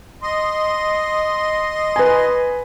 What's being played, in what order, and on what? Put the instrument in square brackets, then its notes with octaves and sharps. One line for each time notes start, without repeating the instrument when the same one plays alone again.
[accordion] D#5 C6
[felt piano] B4 G#5